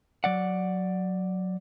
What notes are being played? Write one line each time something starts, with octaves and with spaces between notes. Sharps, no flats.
F#3 D5 F#5